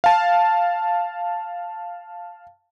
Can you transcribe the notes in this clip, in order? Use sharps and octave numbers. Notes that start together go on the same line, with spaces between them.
F5 A5